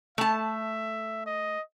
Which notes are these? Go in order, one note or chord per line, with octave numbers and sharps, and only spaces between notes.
A3 E5 A5
D#5